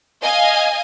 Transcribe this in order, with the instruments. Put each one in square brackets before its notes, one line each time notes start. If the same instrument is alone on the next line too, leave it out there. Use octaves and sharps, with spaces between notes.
[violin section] D#5 F5 G#5